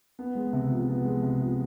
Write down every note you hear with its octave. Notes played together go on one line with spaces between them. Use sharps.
B3
G#3
C3
F3
B3
G#3
C3
F3